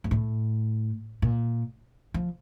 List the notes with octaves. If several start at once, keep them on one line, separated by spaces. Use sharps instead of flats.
F#2
A2
A#2
F3